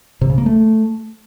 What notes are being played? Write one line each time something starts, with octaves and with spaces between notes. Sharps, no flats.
C3
C#3
A#3
A3